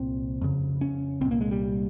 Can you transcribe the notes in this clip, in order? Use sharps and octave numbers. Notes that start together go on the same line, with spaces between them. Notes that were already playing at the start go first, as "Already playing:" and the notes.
Already playing: C2 A#2 C4
F2 C#3
C#4
C2 A#2 C4
A#3
G#3
G3